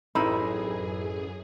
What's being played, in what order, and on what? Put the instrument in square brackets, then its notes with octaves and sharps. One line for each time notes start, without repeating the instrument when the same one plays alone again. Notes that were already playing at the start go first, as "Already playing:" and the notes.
[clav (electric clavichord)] A1 [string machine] F#2 G#4 [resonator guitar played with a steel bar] C4 D#4 E4 [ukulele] B5